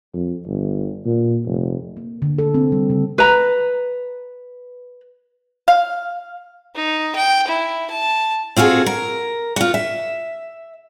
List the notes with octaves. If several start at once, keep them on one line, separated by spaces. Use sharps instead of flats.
F2
G1
A#2
F1
A#3
D3
A4
C4
G3
C#3
B4 A#5
F5
D#4
G5
E4
A5
C4 F4 F#4 G#4 A4
A#4
F4 F#4
E5